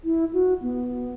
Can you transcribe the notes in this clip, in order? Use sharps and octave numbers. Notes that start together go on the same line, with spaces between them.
E4
F#4
B3